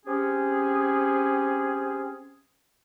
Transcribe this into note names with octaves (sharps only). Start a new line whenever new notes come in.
C4 C#4 G4 G#4